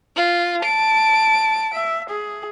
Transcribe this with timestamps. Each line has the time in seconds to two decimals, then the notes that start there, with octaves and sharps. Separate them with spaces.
0.16 F4
0.65 A5 D7
1.74 E5
2.10 G#4